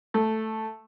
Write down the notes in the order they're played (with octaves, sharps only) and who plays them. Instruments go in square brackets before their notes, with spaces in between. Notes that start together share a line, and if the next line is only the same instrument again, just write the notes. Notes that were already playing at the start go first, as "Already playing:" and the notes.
[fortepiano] A3